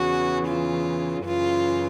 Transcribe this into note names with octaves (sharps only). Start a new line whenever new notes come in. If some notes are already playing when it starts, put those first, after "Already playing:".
Already playing: E2 C#3 E3 F#4
F4
F#2 C#3 E3 F4